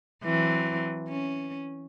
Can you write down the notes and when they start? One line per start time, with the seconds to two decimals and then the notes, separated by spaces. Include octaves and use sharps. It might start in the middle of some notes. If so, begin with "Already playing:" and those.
0.24 E3 F#3 C4
1.09 C#4